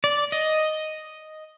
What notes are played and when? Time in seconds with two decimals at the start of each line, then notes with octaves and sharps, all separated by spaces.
0.04 D5
0.32 D#5